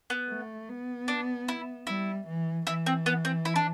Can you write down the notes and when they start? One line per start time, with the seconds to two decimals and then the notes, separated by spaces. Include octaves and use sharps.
0.10 B3
0.30 A3
0.68 B3
1.08 D4
1.48 E4
1.87 G3 E4
2.27 E3
2.66 E3 E4
2.86 C4
3.06 B3
3.25 C4
3.45 E4
3.56 D4